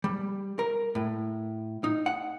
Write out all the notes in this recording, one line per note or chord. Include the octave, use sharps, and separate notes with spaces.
G3
A#4
A2
D#4
F#5